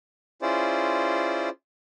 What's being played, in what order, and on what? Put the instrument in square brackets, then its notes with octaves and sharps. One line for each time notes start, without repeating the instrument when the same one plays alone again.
[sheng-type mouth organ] C#4 E4 F4 G#4 C5 D5